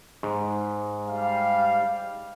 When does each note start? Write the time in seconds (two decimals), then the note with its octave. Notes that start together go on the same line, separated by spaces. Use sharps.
0.23 G#2
1.09 G3 F5